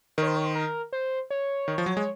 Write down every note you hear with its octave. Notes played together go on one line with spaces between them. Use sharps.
D#3 A#4
C#5
C5
C#5
C5
A#4
C5
C#5
D#3
F3
F#3
G#3